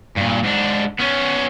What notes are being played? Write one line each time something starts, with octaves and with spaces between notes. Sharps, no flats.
G2 A#2
G#2 D4
B3 C#4